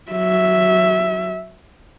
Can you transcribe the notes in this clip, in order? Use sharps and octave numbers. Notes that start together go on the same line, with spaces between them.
F#3 E5